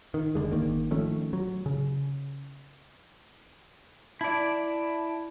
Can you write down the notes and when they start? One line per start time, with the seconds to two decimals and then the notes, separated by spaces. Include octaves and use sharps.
0.14 D#3
0.35 F1 D3 G#3
0.51 G#1 E2 D#3 A#3
0.91 D#3 F3 A3 C#4
1.33 F#3
1.66 C#3
4.21 E4 D5 A5